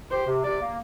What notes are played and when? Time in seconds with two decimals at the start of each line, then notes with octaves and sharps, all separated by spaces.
0.11 G4 C5
0.27 C3
0.44 C3 D5
0.60 A#3